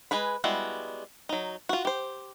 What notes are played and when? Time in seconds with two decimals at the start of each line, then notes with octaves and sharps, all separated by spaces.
0.11 G#3 G#4 B4 B5
0.44 G3 G#3 B3 E4 F#4
1.29 F#3 D#4
1.69 F4 F#4
1.85 G4 C5